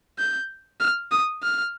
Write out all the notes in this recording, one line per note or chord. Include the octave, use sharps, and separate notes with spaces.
G6
F6
D#6
F6